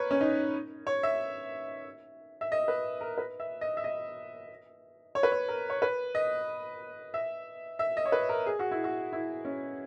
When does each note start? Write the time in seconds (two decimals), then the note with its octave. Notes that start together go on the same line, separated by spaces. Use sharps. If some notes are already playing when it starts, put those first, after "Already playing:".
Already playing: A#4 B4 C#5
0.11 C#4
0.21 D#4
0.87 C#5
1.03 E5
2.41 E5
2.52 D#5
2.68 B4
3.01 A#4
3.18 B4
3.40 E5
3.61 D#5
3.77 E5
3.84 D#5
5.15 C#5
5.23 B4
5.32 C#5
5.49 A#4
5.70 C#5
5.82 B4
6.15 D#5
7.14 E5
7.79 E5
7.97 D#5
8.06 C#5
8.12 B4
8.29 A#4
8.46 G#4
8.59 F#4
8.71 E4
8.84 F#4
9.13 E4
9.45 C#4